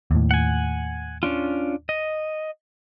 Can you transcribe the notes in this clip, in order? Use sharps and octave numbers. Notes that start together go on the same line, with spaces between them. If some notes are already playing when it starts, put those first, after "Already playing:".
D#2 A2
F#5 G#5
C#4 D4 F4
D#5